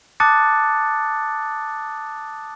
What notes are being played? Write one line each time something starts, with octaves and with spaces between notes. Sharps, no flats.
A5 D6 D#6 F#6 A6 C#7